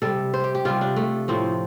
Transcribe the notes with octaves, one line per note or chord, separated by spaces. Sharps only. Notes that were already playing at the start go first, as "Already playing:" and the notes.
C3 G3 A4
C5
G4
G4
C3 G3 F4
D4
A3
A2 F3 C4